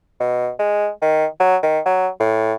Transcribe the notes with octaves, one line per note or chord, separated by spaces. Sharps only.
B2
G#3
D#3
F#3
D#3
F#3
A2